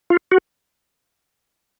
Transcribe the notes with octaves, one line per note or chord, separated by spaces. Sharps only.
F4
F#4